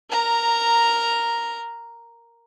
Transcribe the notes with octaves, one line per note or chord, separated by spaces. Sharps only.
A#4 A#5